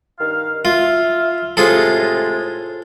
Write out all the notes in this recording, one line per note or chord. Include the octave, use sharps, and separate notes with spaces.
G2 D#3 F5
F4 E5 F5
A2 C3 G#3 F4 G#4 A4